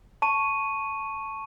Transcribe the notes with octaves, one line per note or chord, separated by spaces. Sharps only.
A5 C#6 D#7